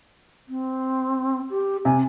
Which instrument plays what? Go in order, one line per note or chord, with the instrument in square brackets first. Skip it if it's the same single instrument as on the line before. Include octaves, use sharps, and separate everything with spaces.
[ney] C4
G4
[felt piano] C3 [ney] G#5